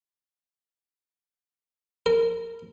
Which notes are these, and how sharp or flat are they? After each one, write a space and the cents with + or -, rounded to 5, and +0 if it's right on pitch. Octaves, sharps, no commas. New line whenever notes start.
A#4 -20